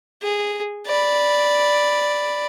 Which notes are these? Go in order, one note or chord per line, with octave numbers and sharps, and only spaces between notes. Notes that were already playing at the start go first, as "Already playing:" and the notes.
G#4
D5 B5